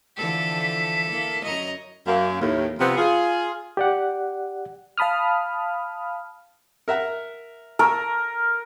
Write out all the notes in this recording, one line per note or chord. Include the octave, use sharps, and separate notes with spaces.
D3 E3 F3 A4 B6
A#3 E4
F#2 F#3 C#5 D#5 A#5
F#2 A#3
D#2 A2
C3 F3 B3 C4
F4 G#4
G4 D5 F#5
F5 A5 B5 D#6 F6
A#4 E5 F#5
A#4 A5 C#6 E6